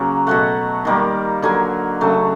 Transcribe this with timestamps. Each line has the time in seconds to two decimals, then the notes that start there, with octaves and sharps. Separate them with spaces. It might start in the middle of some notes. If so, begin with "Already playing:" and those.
Already playing: C#3 F#3 A#3
0.27 B2 F#3 A3 F#5
0.85 D#3 G3 A#3
1.42 D3 F#3 A#3 G#5
2.01 C#3 F#3 A3